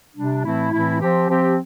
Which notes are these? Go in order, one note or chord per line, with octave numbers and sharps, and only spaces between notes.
C3 G3 D4
A2 E3 A3 C4 E4
A2 E3 A3 C4 E4
F3 C4 G4
F3 C4 G4